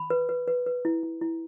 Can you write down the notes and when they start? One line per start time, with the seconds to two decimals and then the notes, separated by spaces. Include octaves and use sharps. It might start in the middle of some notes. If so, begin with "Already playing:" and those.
Already playing: B5
0.10 B4
0.29 B4
0.48 B4
0.66 B4
0.85 E4
1.03 E4
1.21 E4